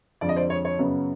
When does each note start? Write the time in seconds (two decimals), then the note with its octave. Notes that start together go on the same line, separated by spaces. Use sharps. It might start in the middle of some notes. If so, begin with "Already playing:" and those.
0.21 F2 D3 F3 G#3 D5
0.29 D#5
0.36 C5 D5
0.50 C#5
0.65 C#5
0.79 F#2 C#3 F#3 B3